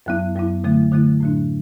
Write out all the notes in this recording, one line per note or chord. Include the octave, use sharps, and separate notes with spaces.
F#2 F#3 B3 E4
F#2 F#3 B3 E4
D3 F#3 A3 E4
D3 F#3 A3 E4
A2 F#3 D4